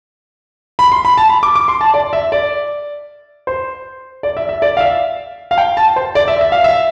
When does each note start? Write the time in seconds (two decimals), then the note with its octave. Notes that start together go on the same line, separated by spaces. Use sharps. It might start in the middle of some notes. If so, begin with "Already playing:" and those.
0.79 B5
0.92 C6
1.05 B5
1.17 A5
1.30 B5
1.43 D6
1.55 D6
1.68 C6
1.81 A5
1.94 D5
2.13 E5
2.32 D5
3.47 C5
4.23 D5
4.37 E5
4.49 E5
4.62 D5
4.77 F5
4.81 E5
5.51 F5
5.58 G5
5.77 A5
5.96 C5
6.15 D5
6.28 E5
6.41 E5
6.52 F5
6.64 E5